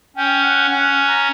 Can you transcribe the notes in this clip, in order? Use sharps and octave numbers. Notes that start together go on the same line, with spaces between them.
C#4 G5
F#5
C#4 F#5
A#5